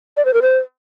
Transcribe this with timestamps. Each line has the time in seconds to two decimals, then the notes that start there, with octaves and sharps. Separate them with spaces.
0.17 D5
0.25 C5
0.33 A#4
0.42 C5